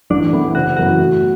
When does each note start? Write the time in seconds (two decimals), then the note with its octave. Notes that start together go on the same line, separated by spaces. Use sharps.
0.10 A1 D4
0.32 A2 E3 B3 E4
0.55 F#1 F#4
0.77 F#2 E3 B3 E4 F#4
0.99 A2